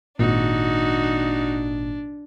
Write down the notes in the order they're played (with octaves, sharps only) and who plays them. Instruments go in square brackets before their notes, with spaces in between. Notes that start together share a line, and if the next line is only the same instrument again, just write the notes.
[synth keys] G#1 A#2 [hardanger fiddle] D4 [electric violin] D#4 F#4